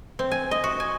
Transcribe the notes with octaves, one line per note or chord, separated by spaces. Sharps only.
C4
G#5
D#5
F#4
G#5